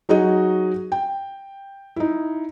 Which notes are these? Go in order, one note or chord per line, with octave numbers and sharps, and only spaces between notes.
F#3 D#4 F#4 G#4 D#5
G5
D#4 E4